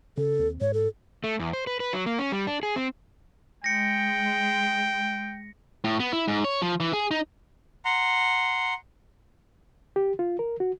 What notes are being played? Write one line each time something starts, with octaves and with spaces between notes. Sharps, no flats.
C#3 A4
D#2 C4
G#2 C#5
A4
A3
E2
C5
B4
B4
F#3
A#3
C#4
G3
D4
G#4
C4
G#3 G5 A#6 C#7
A2
B3
E4
G#2
C#5
F3
E3
G#4
D#4
F#5 A#5 C6
G4
F4
A#4
F#4